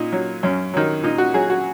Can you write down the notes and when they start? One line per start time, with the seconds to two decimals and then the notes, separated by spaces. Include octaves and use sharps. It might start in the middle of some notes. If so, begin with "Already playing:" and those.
Already playing: A#2 D#4
0.12 F#3
0.43 F#2 C#4
0.74 D#3 F#3
1.03 A#2 D#4
1.18 F#4
1.34 F#3 G#4
1.50 F#4